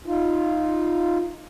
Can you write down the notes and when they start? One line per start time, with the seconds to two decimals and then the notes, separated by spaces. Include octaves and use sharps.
0.06 D#4 F4